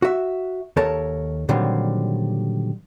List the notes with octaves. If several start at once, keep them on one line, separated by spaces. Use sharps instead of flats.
F#4 E5
D#2 A4 A#4 C#5 A5
A#2 D3 D#3 F#3 G3 C4